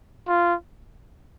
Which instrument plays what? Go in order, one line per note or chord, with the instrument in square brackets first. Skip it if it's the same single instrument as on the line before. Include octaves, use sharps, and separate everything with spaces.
[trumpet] F4